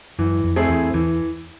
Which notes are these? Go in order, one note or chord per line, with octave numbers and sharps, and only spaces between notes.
F#2 E3
F2
A3 C4 E4 G#4
E2
E2 E3